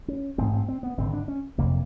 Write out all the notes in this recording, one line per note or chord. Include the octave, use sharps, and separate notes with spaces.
C#4
A1 G#2 C4
C4
C4
B3
G#1 G2 D3 C4
D4
C#4
F#1 F2 C3 A#3